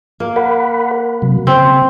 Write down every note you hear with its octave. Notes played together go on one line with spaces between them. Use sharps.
A#3
A#4 F#5 B5
C3 F#3
C#3 C4